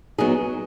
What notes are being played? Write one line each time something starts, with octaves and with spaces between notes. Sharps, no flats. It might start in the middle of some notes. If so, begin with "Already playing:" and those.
F#3 B3 D#4 G#4